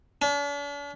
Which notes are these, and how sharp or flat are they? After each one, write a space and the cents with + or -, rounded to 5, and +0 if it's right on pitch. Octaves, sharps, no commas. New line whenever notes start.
D4 -45